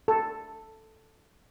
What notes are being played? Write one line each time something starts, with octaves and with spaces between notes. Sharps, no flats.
A4